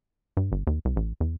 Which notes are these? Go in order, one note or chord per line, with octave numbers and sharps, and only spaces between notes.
G2
G1
D#2
C2
A1
E2